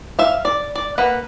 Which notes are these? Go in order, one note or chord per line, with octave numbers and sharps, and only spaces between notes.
E5 F5
D5
D5
A#3 B4 F#5